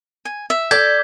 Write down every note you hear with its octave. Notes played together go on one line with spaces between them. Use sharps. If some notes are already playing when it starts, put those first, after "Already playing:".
G#5
E5
A4 D5 G6 G#6 B6